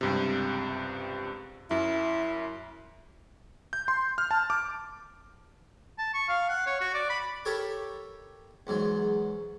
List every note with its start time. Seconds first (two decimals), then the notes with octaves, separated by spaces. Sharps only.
0.01 C#2 G2 C3
1.71 F#2 E4
3.73 G6
3.88 C6
4.18 F6
4.31 A5
4.50 D6
5.98 A5
6.14 C#6
6.29 F5
6.49 F#5
6.66 C#5
6.81 F#4
6.94 D5
7.10 B5
7.45 G4 A4 A#4 C#5 A5 B5
8.67 E2 G#2 F#3